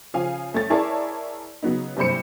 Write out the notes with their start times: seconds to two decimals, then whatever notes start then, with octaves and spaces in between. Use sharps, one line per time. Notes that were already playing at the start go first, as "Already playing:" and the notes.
0.14 C#3 F3 F5 G#5
0.54 A3 C#4 A6
0.70 E4 G#4 A#4 C#5 D5 A5
1.63 C#3 F#3 B3 D#4
1.97 F#1 G2 C3 C5 B5 C#7